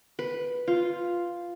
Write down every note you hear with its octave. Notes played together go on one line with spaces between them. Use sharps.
B4
F4